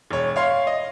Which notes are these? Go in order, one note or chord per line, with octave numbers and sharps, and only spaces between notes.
E1 C#5
C#5 F5 C6
D#5